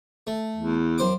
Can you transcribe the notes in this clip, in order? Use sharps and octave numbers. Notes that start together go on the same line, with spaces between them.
A3
E2
F#2 C5 D6